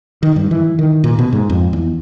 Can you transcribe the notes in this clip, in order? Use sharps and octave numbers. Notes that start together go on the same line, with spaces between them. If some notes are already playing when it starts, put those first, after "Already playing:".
D#3
G2
E3
D#3
A#2
B2
G#2
F2
E2